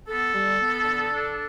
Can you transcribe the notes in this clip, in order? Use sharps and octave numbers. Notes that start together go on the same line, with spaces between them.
B3 A4
G3
B3
D3
D4